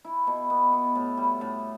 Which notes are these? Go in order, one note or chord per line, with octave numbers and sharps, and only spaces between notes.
E4
B2
B3
B3
A2
G3
A2